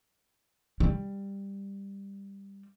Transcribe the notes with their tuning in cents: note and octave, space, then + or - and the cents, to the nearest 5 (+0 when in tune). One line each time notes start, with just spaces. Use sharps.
G3 +10